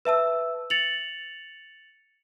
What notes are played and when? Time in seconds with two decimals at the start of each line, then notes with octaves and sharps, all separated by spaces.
0.05 B4 E5 A5 E6
0.70 A6 C#7 F7 F#7